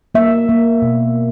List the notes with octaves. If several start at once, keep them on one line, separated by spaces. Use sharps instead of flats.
A#3 E5
A#3
B2